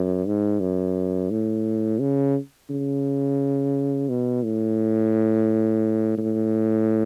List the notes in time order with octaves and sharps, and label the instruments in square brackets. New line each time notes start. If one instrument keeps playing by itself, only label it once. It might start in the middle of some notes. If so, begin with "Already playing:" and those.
Already playing: [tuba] F#2
G#2
F#2
A2
C#3
C#3
B2
A2
A2